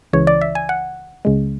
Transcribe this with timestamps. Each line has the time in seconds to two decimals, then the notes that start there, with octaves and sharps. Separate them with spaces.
0.13 C#2 C#3 E3 C#5
0.27 D5
0.41 E5
0.55 G#5
0.69 F#5
1.25 C#2 C#3 G#3